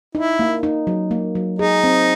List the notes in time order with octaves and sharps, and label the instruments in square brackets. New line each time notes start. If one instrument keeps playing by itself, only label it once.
[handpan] D#4 [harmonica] E4
[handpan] A#3
D#4
F#3
A#3
F#3
[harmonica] D#4 [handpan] G#4
[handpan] C4